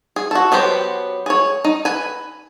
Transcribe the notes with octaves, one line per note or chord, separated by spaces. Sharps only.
G#4
F#4 A4
F#3 B3 G4 C5
G#4 C#5
D#4
B4 G#5